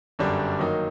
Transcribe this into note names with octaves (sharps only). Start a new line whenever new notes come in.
G1 F#2 D3 G3 D4
D#3 F#3 A#3 D#4